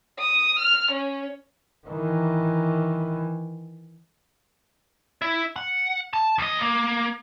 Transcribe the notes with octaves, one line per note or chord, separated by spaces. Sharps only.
D#6
F6
C#4
D#3 E3
E4
F#5
A5
D2 D#5
A#3